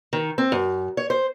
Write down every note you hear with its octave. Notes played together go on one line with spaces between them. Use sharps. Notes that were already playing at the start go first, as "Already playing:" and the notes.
D#3
C4
F#2
C#5
C5